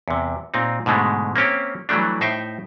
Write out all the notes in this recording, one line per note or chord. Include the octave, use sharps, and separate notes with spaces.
E2 C3
A#2 C4 D#4
G#2 B2 D3 G#3 A3
A#3 C4 C#4 G4
E3 F#3 G3 A3 D4
A2 D#4 C5 E5 G5